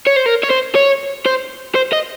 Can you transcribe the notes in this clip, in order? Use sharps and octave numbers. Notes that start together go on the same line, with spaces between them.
C#5
C5
A#4
C#5
C5
C#5
C5
C5
D#5